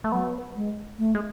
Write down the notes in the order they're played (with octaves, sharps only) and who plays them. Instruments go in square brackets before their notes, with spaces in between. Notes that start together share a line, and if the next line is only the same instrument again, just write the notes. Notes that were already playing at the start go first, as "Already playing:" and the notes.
[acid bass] A3
[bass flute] F#3 [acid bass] B3
[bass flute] G#3
A3
[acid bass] G#3